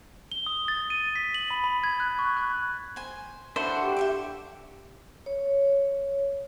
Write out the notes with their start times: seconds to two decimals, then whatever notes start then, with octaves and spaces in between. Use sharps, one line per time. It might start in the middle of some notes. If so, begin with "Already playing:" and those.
0.32 G7
0.46 D#6
0.68 A6
0.90 D#7
1.16 B6
1.34 F#7
1.51 B5
1.64 B5
1.84 G#6
2.00 F#6
2.19 C#6
2.37 F#6
2.96 C5 G#5
3.56 D4 E4 F#4 A4 C5
3.82 G4
3.96 E5 F5 D6
5.26 C#5